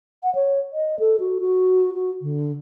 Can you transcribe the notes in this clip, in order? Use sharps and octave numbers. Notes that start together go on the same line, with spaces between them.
F#5
C#5
D#5
A4
F#4
F#4
F#4
D3